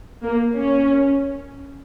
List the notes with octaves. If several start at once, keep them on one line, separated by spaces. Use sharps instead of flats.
A#3
C#4